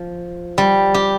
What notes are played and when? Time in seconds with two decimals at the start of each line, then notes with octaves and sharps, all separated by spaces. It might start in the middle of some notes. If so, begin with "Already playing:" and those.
Already playing: F3
0.58 G3
0.94 G4